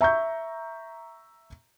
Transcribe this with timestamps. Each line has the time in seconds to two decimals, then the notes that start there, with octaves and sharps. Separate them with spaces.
0.01 E5 A#5 C#6 G6